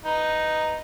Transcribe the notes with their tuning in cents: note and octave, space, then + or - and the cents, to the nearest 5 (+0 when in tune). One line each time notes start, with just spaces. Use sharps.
D#4 +0 B4 +0